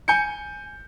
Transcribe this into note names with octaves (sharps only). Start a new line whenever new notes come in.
G#5 G6 C#7